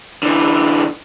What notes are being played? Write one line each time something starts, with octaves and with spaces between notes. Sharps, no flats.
D3 E3